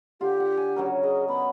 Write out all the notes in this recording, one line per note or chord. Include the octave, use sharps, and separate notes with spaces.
D3 F4 G4
F#5
G#5
C#3 F#3 A#4
G#4 D#5
B3 B5